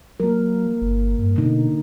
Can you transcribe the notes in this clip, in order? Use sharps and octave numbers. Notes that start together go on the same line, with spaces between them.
F#3 A#3 A#4
G1
G2
B2 D3 D#4